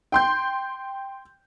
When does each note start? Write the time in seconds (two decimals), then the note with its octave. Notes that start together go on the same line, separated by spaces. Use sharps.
0.12 G5 C6 G6